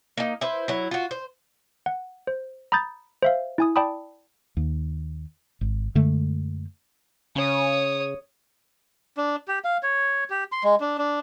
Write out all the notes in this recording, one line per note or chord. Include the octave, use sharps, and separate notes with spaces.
A#3 D#4
E4 B4 C5
F#3 E4
F4 F#4
C5
F#5
C5
A#5 B5 D#6 G6 A6
C5 E5 F5
E4 G#5 D#6
D5 G5 A5 B5 D#6
D#2
G#1
F#2 D3 G#3 A3
C#3 C#5 D#6
D4
G4
F5
C#5
G4
C6
G#3
D4
D4